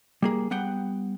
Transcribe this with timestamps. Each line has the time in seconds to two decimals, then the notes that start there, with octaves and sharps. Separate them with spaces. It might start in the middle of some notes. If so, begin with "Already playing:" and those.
0.22 G3 A#3 G#4
0.51 G3 B3 F#5 G5